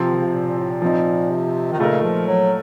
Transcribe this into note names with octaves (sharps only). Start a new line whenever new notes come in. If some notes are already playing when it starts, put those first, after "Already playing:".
Already playing: C3 F3 C4
D#3
C#3
C3
A#2
A#2
A2
A#2
F3 C4 D#4
C3
D#3
A#2 C#3 A3 D#4 A#4
F3
F#3